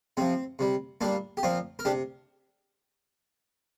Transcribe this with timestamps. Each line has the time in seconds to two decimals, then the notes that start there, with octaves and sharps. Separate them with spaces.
0.17 C3 F3 C4
0.59 C3 G3
1.01 A#2 G3 A#3 D4
1.37 G4
1.43 A#2 F3 C4 F4
1.79 A#4
1.85 C3 D4 G4